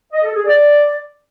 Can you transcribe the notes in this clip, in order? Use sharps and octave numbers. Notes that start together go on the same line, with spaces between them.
D#5
A4
G#4
D5